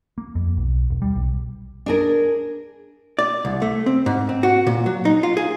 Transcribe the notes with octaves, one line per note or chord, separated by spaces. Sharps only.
A#3
F2
B1
E1
G3
B1
D4 G#4 A#4
D5
C2
A3
C4
G#2
C4
F#4
A#2
F#3
D#4
F4
G#4